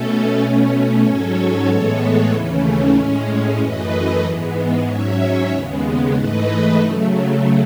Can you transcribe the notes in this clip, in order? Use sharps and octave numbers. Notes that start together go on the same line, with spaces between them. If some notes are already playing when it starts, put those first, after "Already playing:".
Already playing: B2 A3 C#4 A4
B2 A3 C#4
G#2 F#3 C#4 A4 C#5
A2 E3 G#3 B3
D#2 C#3 E3 A3 C#4
A2 G#3 C#4
F#2 E3 A3 B4 D#5
G#2 E3 G#3 B3
G#2 F#3 C#4 C#5 E5
D#2 C#3 G#3 B3
G#2 E3 A3 B4 D#5
C#3 F#3 A3